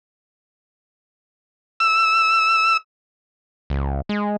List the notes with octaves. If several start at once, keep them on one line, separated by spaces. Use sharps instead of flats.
E6
C#2
G#3